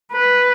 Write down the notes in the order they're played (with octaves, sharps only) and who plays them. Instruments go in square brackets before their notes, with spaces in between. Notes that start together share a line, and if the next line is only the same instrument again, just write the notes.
[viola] B4